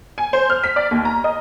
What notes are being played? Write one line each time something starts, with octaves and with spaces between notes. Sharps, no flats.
G#5
C5
F6
B6
D5
D#2
A#5
D#5